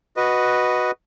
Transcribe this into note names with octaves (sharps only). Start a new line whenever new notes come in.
F#4 B4 D#5